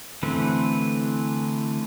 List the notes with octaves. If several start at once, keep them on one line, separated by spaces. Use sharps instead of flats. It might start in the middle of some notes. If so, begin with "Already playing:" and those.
D3 E3 A3 C4 B4